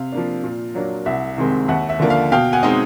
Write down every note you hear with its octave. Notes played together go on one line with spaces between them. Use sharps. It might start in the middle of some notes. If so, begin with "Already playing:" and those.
Already playing: C3 F5
F3 A#3 D4
A#2
F#3 A#3 D4
C2 E5 F#5
C3 D#3 G#3 C4
D#2 E5 F#5
E5
D3 F3 A#3 D4
F5
B2 F5 G5
F#5 G#5
G#3 C4 D#4